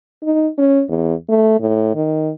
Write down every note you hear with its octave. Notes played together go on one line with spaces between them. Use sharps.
D#4
C#4
E2
A3
A2
D#3